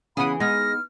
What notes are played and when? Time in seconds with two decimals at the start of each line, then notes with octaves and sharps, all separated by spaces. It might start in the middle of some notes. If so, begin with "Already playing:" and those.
0.17 C#3 E3 B3 G#4 F#5 B5 D#6
0.40 G#3 B3 D#4 F6 A#6